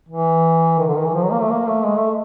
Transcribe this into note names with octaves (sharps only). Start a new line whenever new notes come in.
E3
D#3
D3
D#3
E3
F3
F#3
A#3
A3
A#3
A3
G#3
A3